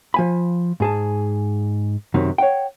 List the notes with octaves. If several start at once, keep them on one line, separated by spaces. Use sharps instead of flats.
F3 G#5 B5
G#2 G#4 A5
F#2 C3 D#3
C#5 F#5 G5